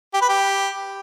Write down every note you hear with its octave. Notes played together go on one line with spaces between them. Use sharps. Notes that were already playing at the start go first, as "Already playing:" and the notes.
G4
B4
G4